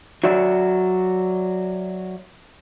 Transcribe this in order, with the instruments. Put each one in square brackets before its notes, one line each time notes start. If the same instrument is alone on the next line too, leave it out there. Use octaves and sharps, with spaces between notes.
[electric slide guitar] F#3 F#4 D5 E5